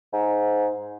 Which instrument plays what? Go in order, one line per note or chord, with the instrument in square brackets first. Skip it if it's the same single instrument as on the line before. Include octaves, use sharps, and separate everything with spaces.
[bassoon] G#2